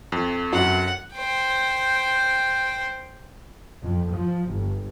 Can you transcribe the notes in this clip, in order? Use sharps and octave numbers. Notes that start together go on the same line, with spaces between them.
F2
F#2 F#5
C5 G5
F2
F3
G1